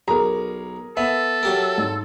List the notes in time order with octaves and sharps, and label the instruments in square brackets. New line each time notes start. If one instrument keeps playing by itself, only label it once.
[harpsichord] B1 [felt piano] G#4 A#4 [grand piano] A#5
[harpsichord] B3 [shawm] A4 [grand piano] E5
[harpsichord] F#3 G4 A#4
[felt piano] G#2